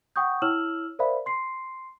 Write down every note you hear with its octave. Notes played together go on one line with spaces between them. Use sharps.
F#5 G5 C#6 D#6 G6
E4 C#5 E6 F6 E7 F#7
A#4 C5 D5 E5 F5 B5
C6 C7